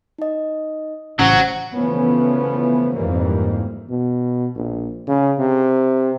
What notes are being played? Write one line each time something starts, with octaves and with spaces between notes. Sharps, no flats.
D#4 D#5
A1 C#3 F#3 C#4 C5 F#5
C#3 E3 F3 A3 B3 C#4
F2 G#2 E3 G3 A#3
B2
A#1
C#3
C3